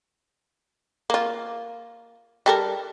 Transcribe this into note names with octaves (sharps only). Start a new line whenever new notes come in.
A#3 F4
G3 A4 A#4